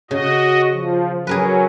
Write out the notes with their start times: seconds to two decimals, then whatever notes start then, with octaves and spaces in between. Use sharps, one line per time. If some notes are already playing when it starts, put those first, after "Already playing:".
0.11 C#3 F#4 D#5
0.72 F3
1.27 F#3 C#4 G#4 A#4 B4